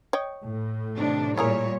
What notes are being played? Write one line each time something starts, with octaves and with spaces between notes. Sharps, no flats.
C#5 D#5 G5
A2
C3 D#3 D4
A#2 G3 E4 G#4 A#4 C#5